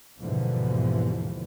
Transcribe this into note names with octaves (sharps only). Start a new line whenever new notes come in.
D#2 G#2 B2 D3 E3 F3